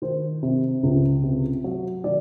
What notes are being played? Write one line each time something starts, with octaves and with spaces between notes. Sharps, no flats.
D#3 C5
C3
C#2
C3
F#3
D#3 D5